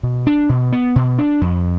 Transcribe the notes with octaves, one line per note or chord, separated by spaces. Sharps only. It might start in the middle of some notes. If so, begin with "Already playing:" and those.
B2
D4
B2
B3
B2
D4
F2